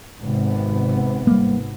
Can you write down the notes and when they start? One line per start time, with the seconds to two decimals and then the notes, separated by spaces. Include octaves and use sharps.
0.21 G#1 C3 B3
1.27 G3 A#3